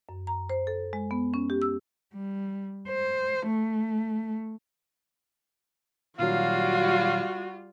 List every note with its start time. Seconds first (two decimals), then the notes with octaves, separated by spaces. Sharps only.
0.09 F#2
0.27 A#5
0.50 C5
0.67 A4
0.93 G#3
1.11 B3
1.34 C#4
1.50 G4
1.62 E6
2.14 G3
2.88 C5
3.46 A3
6.19 A#2 D#3 F#3 G3 F4 F#4 F5